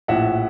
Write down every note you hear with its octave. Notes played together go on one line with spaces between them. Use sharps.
A#1 A2 F3 E5 F#5